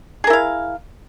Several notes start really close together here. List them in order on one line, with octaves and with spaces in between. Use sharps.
G#4 A#4 E4 F5